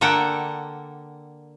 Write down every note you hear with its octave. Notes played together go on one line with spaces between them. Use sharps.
D3 A#3 A4 F#5 G5